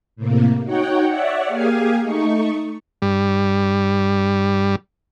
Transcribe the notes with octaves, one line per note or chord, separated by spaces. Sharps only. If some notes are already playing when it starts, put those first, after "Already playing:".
A2 C3 A#3
D#4 F#4 C#5 F#5 G5
C#5 D5 E5 F#5
A#3 G4 G#4 F5 G#5
A3 D#4 C#6
G2 G3